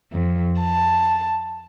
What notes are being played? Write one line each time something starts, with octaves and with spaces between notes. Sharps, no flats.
F2
A5